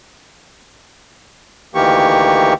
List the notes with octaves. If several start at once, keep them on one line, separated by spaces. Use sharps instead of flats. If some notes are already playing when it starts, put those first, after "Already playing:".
D2 D#3 E3 A#3 G4 C#6